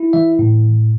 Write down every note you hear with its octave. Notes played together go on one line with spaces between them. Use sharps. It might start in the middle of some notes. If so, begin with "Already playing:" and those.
Already playing: E4
E3 E5
A2